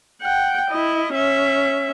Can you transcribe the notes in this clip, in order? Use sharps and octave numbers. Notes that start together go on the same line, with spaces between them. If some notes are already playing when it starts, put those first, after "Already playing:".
F#5 G5
E4 D#5
C#4 E5